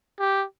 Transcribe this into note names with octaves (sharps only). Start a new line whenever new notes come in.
G4